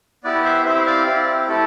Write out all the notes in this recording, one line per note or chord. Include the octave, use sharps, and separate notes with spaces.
B3 E4 G4 B4 D5
C5 E5
C4 E4 G4 C5 E5
D5 F5
C4 E4 G4
A3 E4 G4 A4